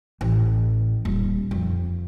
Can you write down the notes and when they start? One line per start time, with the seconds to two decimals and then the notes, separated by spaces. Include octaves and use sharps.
0.21 A1
1.05 D#1
1.51 F2